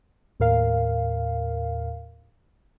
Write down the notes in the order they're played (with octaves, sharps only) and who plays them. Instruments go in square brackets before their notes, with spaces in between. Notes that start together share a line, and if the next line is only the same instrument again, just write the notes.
[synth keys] D#2 A2 A#4 F5